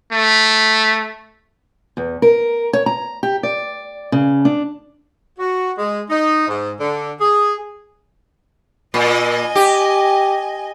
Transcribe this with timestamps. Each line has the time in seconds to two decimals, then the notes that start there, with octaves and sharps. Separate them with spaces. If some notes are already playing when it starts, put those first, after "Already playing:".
0.12 A3
1.97 E2
2.22 A#4
2.73 C#5
2.86 A#5
3.23 G4
3.43 D5
4.12 C#3
4.45 D4
5.39 F#4
5.77 G#3
6.10 D#4
6.48 G#2
6.80 D3
7.21 G#4
8.94 A#2 D#5 G#5
9.55 G4